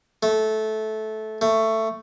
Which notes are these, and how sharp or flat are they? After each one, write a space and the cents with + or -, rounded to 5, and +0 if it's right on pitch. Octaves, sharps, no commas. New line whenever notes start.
A3 -15
A3 +15